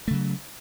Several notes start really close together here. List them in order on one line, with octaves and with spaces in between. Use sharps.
A3 C#3 F#3